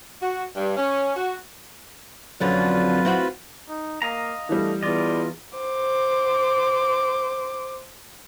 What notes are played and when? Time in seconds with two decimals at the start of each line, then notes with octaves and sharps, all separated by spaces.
0.21 F#4
0.56 G2
0.77 C#4
1.16 F#4
2.40 F2 D3 F#3 C#4 F4 B4 A6
3.05 C4 E4 F#4
3.69 D#4
4.02 A#3 D#5 F5 A#5
4.49 E3 G3 A3 D4
4.83 E2 F4 D5 D#5
5.58 C5 D6